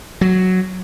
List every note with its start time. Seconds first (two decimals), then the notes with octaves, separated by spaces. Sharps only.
0.21 F#3